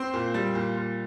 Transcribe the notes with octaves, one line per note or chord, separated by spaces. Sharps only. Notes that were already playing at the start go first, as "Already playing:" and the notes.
Already playing: C4 C6
A#2
G3
A#2
A#2